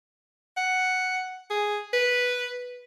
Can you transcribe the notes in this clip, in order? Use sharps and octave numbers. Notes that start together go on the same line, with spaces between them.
F#5
G#4
B4